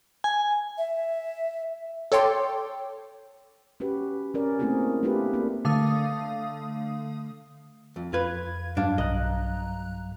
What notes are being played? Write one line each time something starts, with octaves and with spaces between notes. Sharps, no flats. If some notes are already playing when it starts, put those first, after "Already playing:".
G#5
E5
A4 C#5 G5 C6 D6
C#4 F#4 G4 B4
C#4 A#4 D5
A3 A#3 C4 E4 F#4 G#4
A3 B3 D4 F4 G4 B4
A#3 C4 D4
D3 A3 F5 D#6
F2
F2 F4 B4 G#6
G2 F#3 D4 F5
B1 D#5 A#5 F#6